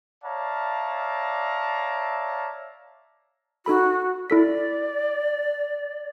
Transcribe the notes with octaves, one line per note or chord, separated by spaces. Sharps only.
C#5 D5 E5 F5 A5 A#5
D#4 F#4 A4 B5
E4 A4 D5 B6